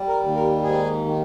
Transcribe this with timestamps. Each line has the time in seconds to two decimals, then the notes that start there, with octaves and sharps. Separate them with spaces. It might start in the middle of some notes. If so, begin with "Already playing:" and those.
Already playing: G3
0.08 A#4
0.22 D#2
0.36 A#4
0.63 G#2 G#4
1.05 D#3